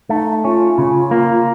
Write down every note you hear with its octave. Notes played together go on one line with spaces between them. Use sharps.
A3 D#4
C#4 F4
C#3
A#3